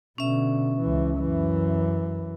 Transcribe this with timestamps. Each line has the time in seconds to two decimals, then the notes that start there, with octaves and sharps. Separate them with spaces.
0.18 B2 D3 C#4 E5
0.81 C#2 E3
1.18 F#2 E3